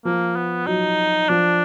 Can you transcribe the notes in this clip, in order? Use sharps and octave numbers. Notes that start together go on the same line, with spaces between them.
F3 A#3
B3
F#3 D#4
F3 D4